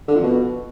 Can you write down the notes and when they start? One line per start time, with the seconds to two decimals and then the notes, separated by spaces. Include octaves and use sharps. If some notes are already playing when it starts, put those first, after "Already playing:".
0.08 D3
0.15 F2
0.23 B2